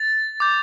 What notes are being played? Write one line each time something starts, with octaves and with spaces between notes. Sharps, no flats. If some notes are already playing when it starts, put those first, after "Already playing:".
Already playing: A6
D6 G6